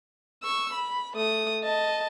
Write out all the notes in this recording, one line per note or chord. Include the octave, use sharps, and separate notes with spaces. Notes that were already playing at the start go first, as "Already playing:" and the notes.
C#6 E6
B5
A3 D#6
D#5 A5